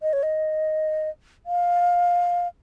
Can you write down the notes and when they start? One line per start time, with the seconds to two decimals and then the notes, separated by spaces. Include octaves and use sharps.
0.02 D#5
0.13 C#5
0.23 D#5
1.46 F5